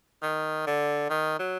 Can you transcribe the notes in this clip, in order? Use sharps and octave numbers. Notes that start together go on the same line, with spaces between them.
D#3
D3
D#3
F#3